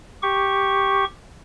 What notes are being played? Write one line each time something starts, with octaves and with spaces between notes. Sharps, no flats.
G4 C#6